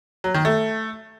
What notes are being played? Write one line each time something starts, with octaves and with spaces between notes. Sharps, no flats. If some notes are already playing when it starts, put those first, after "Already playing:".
F#3
D#3
A3